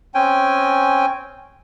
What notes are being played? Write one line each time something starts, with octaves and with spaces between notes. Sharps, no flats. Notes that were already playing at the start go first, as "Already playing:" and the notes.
C4 C#4 G5 G#5